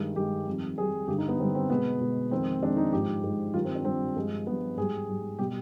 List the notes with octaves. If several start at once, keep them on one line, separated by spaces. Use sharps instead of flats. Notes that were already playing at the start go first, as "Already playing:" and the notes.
Already playing: G2 D#3 G#3
G2 D#3 G#3 G4
F2 D#3 G3
F2 D#3 G3 G#4
G2 D3 G3 G4
D#4
B3
G2 D3 G3 C4
C4
B2 G#3 B3
B2 G#3
F2 D#3 G#3 C4
F2 D#3 G#3 D4
D#4
G#2 F3 G#3 G4
G#2 F3 G#3
G2 D#3 G3 F4
C4
D4
G2 D#3 G3 C4
G2 F3 G#3
G2 F3 G#3 B3
G#2 G3 G#4
G#2 G3
B2 G3 G4